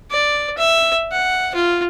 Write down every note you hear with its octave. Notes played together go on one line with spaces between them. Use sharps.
D5
E5
F#5
F4